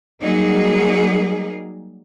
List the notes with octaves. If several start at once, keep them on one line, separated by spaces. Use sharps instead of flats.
F#3 G3 A#3 D#4 G#4 A#4